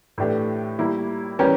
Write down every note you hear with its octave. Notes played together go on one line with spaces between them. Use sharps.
A2 E3 A3 D4 G4
G3 A#3 E4
E3 G3 C#4 G4 A#4